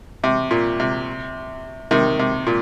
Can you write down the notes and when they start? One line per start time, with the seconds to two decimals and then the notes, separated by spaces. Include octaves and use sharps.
0.24 C3
0.51 A#2
0.80 C3
1.91 C3 D#3
2.19 C3
2.47 A#2